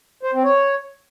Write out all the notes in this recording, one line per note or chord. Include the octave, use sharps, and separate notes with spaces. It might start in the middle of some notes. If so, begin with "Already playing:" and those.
C5
C4
C#5